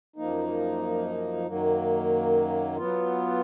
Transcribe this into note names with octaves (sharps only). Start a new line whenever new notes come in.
F#2 F3 A#3 D#4
F#2 D#3 F#3 A#3
F#3 B3 F4